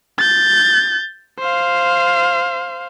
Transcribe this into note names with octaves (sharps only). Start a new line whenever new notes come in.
G6 A6
C5 F5